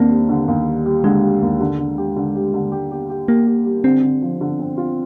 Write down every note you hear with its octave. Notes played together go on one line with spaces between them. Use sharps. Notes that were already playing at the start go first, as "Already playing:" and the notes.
Already playing: D#2 A#3 C4 D4
G3
D3
D#2
G3
G3
D3 G#3
G3
D#2
D3
D3
G4
D3
G3
D3
G4
G4
G4
A#3 G4
G4
G3
D3 C4
D3
F3
D3
C4
F4